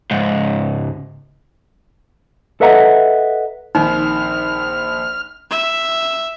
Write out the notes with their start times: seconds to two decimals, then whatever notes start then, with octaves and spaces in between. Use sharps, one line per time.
0.11 C#2 G#2
2.61 A4 B4 D#5 E5 F#5 A#5
3.75 A#1 D#3 C4 D#4 C5 F6
5.51 E5